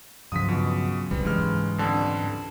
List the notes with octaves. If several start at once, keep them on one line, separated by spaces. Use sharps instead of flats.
C#2 G2 F3 F#3 D#6 B6 C7
B2
E1 C2 F#2 G3 B4
C#2 G#2 E3 G#3 F6
F2 D3 G3 G5 A5